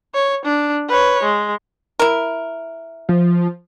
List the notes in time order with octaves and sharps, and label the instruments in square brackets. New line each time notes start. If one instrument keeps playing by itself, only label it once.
[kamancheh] C#5
D4
B4 C#5
G#3
[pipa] E4 A#4
[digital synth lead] F3